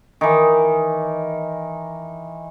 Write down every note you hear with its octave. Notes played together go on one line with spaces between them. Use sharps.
D#3 E3